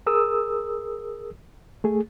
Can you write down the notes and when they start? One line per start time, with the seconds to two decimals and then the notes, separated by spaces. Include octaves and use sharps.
0.06 G#4 A#4 D#6 E6
1.84 A3 G#4